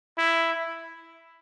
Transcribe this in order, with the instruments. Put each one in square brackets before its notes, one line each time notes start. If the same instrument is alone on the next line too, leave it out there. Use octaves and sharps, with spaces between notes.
[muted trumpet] E4